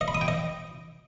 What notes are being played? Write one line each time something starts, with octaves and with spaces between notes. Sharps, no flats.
D#5
B5
D#6
G5
D#5